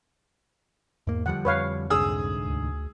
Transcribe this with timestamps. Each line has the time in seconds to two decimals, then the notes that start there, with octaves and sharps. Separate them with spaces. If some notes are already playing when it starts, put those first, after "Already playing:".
1.07 E2 G#2 A#3
1.26 D3 F3 G3 F#5
1.45 F2 B4 C#5 F5
1.90 C2 G#2 D3 G#4 D#6 E6
2.46 D2